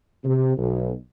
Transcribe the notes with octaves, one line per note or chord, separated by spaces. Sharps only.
C3
B1